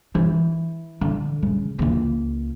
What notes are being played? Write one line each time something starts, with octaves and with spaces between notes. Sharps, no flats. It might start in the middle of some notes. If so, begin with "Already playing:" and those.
E3
D3
C#3
C#2 A#3